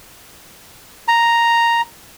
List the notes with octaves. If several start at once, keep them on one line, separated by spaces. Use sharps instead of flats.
A#5